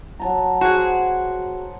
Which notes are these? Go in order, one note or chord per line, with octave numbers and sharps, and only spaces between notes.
F#3 A5 A#5
F#4 G#4 C5